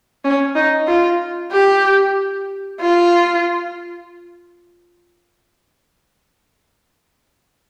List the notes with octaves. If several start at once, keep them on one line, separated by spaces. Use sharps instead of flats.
C#4
D#4
F4
G4
F4